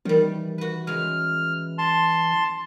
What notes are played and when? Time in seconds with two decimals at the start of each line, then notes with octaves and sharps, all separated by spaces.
0.05 D#3 E3 G3
0.58 F#4 B4
0.87 C#3 G#3 F6
1.78 A5 C6